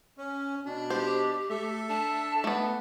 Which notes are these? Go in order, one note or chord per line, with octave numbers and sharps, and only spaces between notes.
C#4
B2 D4
G4 C5
A3 A4 E5
D4 A5
A3 B3